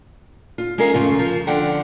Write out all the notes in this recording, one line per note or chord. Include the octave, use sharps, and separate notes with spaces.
F4
G#3 C#4 G#4 A#4 F5
F2 C#3 A3 F4
F3 F4
D3 F3 F#5 G5